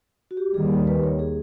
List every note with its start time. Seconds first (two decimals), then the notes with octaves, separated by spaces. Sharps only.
0.31 F#4
0.37 G4
0.54 D#2 D#3 G3 G#4
0.87 B4
1.04 C#5
1.19 G#4